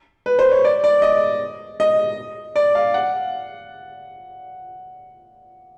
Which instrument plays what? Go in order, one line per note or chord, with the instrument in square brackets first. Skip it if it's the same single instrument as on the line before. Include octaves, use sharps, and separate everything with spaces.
[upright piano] B4
C5
C#5
D5
D5
D#5
D#5
D5
F5
F#5